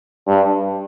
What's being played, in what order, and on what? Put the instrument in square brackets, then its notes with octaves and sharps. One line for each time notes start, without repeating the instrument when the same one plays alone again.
[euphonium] G2